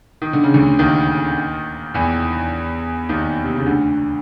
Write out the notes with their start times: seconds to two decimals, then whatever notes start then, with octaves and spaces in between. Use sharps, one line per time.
0.22 D#3
0.33 D3
0.44 C#3
0.54 D2 D3
0.79 D#2 D#3
1.94 E2 E3
3.09 D#2 D#3
3.44 C3
3.55 C#3
3.66 D2 D3